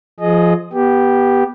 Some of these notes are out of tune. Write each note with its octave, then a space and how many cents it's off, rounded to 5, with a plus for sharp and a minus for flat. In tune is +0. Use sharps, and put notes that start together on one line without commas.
F3 -10 G#4 +20 D#5 -10
B3 -15 G4 +0